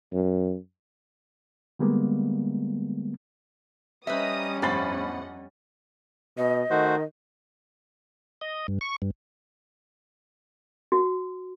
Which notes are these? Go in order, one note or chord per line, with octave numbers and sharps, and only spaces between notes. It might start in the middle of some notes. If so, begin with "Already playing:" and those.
F#2
D3 G3 G#3 A#3 B3
G3 C#4 B4 C5 D#5 E5 A#5 D#6
G1 F2 A2 C5 D#5 F#5 B5 A6
B2 D#5
D#3 A3 F#4 C5
D#5
G2
C#6
G2
F#4